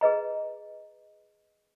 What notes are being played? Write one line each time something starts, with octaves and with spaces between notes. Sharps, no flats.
G#4 B4 D#5 A#5